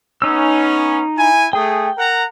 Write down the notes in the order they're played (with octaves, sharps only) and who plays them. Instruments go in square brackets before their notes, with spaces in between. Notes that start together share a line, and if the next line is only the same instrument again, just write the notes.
[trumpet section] B3 C#4 [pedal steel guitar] D#4 E6
[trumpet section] E4 G#5
[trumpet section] A3 G#4 [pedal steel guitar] G5
[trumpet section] A#4 F#5 A#5